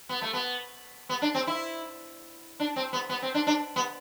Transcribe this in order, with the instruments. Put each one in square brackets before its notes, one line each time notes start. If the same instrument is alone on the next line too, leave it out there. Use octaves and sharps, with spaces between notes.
[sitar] B3
A3
B3
B3
D4
C4
E4
D4
C4
B3
B3
C4
D4
D4
B3